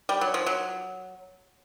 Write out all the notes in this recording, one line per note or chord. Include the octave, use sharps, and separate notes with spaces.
G3
F#3
F3
F#3